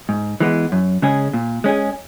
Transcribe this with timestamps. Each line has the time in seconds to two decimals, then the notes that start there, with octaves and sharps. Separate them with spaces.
0.09 G#2
0.40 E3 G#3 B3
0.72 F#2
1.02 C#3 G#3 C#4 G#4
1.33 A#2
1.64 G#3 C#4 G#4